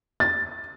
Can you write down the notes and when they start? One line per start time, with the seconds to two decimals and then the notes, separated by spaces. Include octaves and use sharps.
0.20 A6